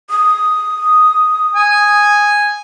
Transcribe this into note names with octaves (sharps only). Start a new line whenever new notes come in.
D#6
G#5